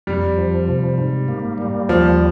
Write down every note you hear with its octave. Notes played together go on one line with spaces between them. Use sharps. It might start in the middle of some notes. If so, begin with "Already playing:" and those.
F2 G3
F3
C3
G#2
A#3
G3
D#2 F3